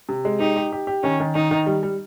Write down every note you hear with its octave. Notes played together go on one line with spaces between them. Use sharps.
C3
G#3
D#4 G4
G4
G4
G4
D#3 C#4
D#3
D#3 D#4
D#3
G3
G3